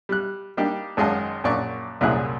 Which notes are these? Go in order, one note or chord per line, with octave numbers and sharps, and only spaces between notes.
G3 F#6
G3 A#3 D4 D#4 G4
G#1 F#2 G#3 D#5 F5 A5
A#1 F#2 A#2 D5 C#6 D6
C2 F#2 A#2 E4 G#4 F#6